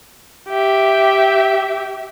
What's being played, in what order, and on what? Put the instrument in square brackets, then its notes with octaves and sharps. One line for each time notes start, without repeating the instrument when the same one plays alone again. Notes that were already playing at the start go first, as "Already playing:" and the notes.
[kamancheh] G4 E5